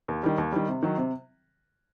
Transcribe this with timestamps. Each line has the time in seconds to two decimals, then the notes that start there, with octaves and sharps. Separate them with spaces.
0.08 D#2
0.23 D#3 G3
0.38 D#2
0.52 D#3 G3
0.68 C3
0.83 D#3 F#3
0.98 C3